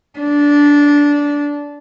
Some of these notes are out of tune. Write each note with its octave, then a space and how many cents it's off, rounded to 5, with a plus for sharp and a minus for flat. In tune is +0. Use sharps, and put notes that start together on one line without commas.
D4 -15